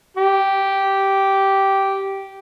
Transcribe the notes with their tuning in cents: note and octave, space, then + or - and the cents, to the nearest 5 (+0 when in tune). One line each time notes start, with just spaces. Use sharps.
G4 -10